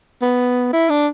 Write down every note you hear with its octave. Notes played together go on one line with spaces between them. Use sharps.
B3
E4
D4